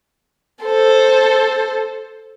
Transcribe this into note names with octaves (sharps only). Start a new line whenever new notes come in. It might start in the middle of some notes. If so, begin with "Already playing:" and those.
A4 C5